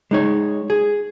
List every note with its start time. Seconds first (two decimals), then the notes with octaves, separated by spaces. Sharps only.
0.11 G#3 D#4 C#5
0.70 G#4